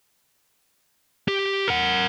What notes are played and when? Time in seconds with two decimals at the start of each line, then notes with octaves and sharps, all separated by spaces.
1.28 G4
1.68 A#4 F#5